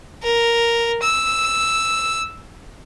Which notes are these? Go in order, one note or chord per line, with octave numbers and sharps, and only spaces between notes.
A#4
E6